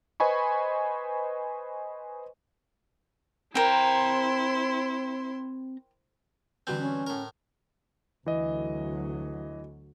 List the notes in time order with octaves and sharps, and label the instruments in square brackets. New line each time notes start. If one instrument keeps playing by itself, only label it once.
[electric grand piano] B4 C5 D#5 G#5 B5 C#6
[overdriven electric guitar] C4 A#5 [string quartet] E4 C5 C6 [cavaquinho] A#4 G5
[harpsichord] G2 E3 C4 [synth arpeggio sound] D3 F#4 G6
[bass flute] C#4
[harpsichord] A2 A#4
[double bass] D2 F#3 [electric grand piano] E3 D#5